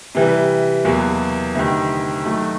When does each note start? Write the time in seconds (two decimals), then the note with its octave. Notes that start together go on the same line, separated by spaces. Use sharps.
0.15 C3 E3 G3
0.85 E2 B2 F#3 A#3
1.55 D2 C3 D#3
2.25 D#3 F#3 A3